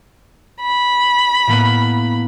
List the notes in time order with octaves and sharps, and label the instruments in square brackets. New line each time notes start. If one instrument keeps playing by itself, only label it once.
[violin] B5
[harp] A2 A#3 B3